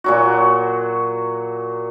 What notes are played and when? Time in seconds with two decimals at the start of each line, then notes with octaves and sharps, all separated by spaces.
0.04 A#2 F#3 F#4